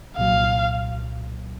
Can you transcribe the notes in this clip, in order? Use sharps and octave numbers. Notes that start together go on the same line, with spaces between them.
C2 A#2 F#3 F5